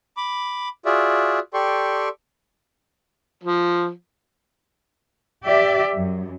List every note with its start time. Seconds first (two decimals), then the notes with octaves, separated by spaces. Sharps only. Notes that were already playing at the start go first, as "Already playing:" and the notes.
0.17 B5 D6
0.86 F4 F#4 G#4 D5 E5
1.54 G4 A4 D5 G5 C6 C#6
3.44 F3
5.45 G4 D5 E5
5.94 F#2